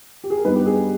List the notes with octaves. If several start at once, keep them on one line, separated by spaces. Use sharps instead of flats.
G4
G#4
A#4
G2 G3 B3 D#4 B4
G4
G#4